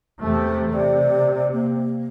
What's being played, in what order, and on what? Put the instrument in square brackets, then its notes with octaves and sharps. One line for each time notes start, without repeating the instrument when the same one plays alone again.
[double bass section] E2 C3 A3
[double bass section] C3 [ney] D5
[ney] A#3